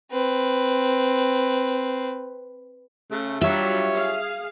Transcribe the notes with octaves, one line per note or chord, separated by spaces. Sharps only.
C4 B4
C#3 A3
F#3 G3 D4 F4 G4 C#5 E5
G#4 F5